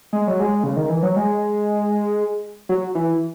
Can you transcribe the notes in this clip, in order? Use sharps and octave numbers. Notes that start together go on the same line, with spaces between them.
G#3
F#3
G#3
C#3
D#3
E3
F#3
G#3
F#3
E3